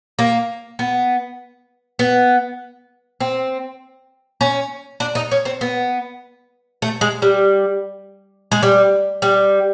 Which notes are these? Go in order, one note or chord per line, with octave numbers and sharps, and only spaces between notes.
A#3
B3
B3
C4
C#4
D4
D#4
C#4
C4
B3
A3
G#3
G3
G#3
G3
G3